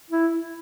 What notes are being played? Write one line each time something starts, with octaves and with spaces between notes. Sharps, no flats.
E4